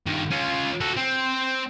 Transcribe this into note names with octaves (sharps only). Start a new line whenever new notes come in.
G2 D#3
C#4 F4
F#4 A4
C4